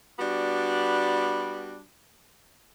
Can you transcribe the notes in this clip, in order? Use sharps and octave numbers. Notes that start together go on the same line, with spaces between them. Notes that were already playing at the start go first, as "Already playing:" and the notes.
G3 B3 D4 F#4